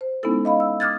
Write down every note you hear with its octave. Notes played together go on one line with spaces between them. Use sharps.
C5
G#3 B3 C#4 D#4 E4 A4
D#5 F5 B5
E6
D6 D#6 F6 F#6 G#6 A6